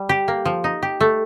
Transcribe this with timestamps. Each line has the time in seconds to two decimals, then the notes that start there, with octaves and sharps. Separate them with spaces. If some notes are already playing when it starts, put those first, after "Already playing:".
Already playing: G3
0.09 G4
0.28 A#3
0.45 F3
0.64 D#4
0.83 G4
1.01 A3